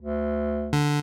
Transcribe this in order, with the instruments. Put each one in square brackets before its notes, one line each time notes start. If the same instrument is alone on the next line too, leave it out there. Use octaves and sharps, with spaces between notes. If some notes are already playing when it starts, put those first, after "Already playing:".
[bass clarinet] D2
[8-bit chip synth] D3